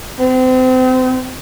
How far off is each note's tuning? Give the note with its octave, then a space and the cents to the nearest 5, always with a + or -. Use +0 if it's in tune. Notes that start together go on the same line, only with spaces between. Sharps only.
C4 -35